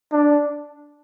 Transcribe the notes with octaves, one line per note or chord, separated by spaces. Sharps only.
D4